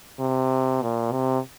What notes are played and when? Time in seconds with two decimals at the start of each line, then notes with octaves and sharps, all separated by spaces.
0.20 C3
0.82 A#2
1.12 C3